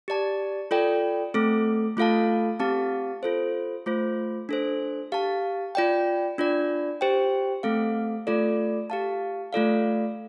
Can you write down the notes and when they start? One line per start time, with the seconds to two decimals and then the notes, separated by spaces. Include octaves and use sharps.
0.08 G4 D5 A5
0.71 F4 A4 D5 G5
1.34 A3 C4 A4
1.97 A3 F4 A4 F5 A5
2.60 C4 G4 F5 A5
3.23 F4 A4 C5
3.86 A3 F4 C5
4.49 D4 A4 C5
5.12 G4 F5 A5
5.75 F4 D5 G5
6.38 D4 F4 D5
7.01 G4 C5 G5
7.63 A3 C4 A4 F5
8.27 A3 F4 A4 D5
8.90 G4 F5 A5
9.53 A3 F4 A4 D5 F5